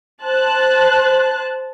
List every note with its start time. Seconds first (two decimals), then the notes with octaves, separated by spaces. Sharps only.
0.22 C5 A5 F#6